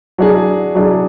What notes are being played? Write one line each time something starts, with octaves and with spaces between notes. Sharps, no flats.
F#3 D4 G#4
F#3 D4 G#4